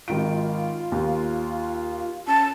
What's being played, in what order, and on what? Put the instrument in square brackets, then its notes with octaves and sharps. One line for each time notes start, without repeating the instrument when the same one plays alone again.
[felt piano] G#1 D#3 D7 [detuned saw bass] F4
[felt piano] D#2
[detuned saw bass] C#4 [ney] A5